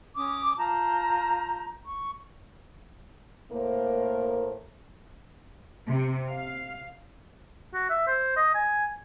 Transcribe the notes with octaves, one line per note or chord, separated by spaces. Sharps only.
C#4 D6 D#6
F4 A5 A#5 G6
C#6
A2 A3 A#3 A#4 C5
C3
F5
F#4
E5
C5
D#5
G#5